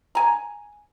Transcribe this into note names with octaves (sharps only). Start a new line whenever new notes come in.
G#5 A#5